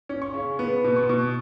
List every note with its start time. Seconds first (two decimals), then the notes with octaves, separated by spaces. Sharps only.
0.09 C#4
0.22 C#6
0.34 C#3
0.59 B3
0.84 B2
0.96 C#6
1.09 B2